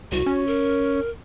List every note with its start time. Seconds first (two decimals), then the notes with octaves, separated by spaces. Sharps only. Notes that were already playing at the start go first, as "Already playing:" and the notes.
0.12 C2 F#4
0.26 C#4
0.47 A#4